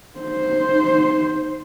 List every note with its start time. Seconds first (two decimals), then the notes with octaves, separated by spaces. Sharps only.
0.19 D#4 C5